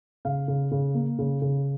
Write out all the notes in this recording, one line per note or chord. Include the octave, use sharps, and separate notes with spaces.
C#3 F5
C#3
C#3
A#3
C#3
C#3